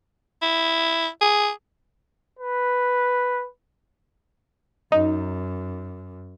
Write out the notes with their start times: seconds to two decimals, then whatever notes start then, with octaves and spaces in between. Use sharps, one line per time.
0.42 E4
1.21 G#4
2.39 B4
4.92 F#2 D#4